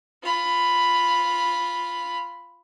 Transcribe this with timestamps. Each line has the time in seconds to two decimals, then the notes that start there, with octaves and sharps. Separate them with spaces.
0.23 F4 B5